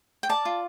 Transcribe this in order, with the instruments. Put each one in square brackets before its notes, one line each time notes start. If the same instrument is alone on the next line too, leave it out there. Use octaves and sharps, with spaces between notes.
[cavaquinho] G5
D5 A5
F4